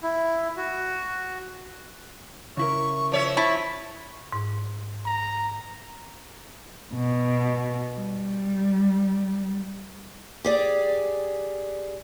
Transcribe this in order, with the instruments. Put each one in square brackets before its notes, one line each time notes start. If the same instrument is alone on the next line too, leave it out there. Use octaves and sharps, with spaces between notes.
[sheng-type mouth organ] E4
F#4
[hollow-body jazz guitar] C#3 E4 A#4 [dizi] C#6
[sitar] F3 C#5 E5
[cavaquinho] E4 [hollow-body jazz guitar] A5 [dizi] C#6
[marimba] G#2
[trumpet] A#5
[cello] B2
G3
[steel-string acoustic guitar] G4 G#4 D5